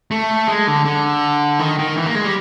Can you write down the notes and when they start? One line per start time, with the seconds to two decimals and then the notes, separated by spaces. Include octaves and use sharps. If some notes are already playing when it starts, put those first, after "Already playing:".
0.11 A3
0.48 G#3
0.67 D3
0.85 D3
1.59 D#3
1.79 D#3
1.97 E3
2.06 A#3
2.15 G#3
2.25 G3